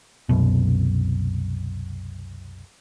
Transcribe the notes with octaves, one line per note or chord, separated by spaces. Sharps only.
C2 F#2 B2